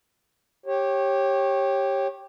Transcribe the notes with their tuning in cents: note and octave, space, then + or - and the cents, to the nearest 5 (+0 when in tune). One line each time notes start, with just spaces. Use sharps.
G4 +0 C#5 -25